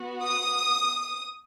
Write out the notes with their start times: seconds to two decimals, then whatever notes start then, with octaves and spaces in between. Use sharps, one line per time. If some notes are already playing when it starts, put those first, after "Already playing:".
Already playing: B3 F#4
0.21 D#6